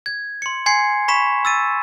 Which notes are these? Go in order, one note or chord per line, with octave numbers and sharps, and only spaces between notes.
G#6
C6 C#7
G#5 C6 G#6 C7 C#7
B5 C#6 B6 E7
E6 A6 D#7